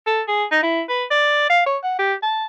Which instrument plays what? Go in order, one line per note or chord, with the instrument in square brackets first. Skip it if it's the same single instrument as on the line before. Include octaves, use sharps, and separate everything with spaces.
[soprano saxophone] A4
G#4
D#4
E4
B4
D5
F5
C#5
F#5
G4
A5